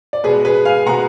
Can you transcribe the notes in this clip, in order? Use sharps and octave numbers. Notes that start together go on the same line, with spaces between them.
D5
B2 G#3 B3 G#4 B4
G#4 B4
F5 G#5
B2 G#3 B3 F#5 A#5